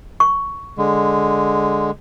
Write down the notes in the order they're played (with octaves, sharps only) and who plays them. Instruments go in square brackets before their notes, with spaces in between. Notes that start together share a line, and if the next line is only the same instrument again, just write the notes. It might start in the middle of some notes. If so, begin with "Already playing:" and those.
[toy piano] C#6
[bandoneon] D3 G#3